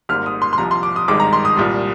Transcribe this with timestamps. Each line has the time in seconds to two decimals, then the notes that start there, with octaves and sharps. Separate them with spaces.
0.09 G#1 G#2 G3 A#3 F6
0.26 D#6
0.42 C6
0.53 C6
0.58 C2 C3 F3 A#5
0.71 C6
0.83 D6
0.96 D#6
1.08 G#1 G2 D#3 G#3 D6
1.20 A#5
1.33 C6
1.45 D#6
1.57 C2 A#2 G3